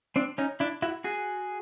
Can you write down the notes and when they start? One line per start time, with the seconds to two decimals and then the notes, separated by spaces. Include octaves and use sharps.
0.16 C4 D4
0.38 C#4 D#4
0.60 D4 E4
0.82 E4 F#4
1.04 F#4 G#4